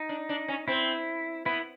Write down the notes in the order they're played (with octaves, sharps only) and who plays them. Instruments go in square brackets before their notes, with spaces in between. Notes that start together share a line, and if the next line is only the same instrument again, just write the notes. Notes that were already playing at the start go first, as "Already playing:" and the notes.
Already playing: [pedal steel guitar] D#4
[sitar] D4
D4
C#4
[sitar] C4 [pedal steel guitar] E4
[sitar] B3 [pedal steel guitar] E4